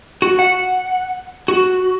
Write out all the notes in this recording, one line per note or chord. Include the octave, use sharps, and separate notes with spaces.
F#4
F#5
F#4